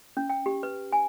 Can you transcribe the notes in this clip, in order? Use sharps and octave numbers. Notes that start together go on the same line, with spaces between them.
C#4
G5
G4
B4
G#5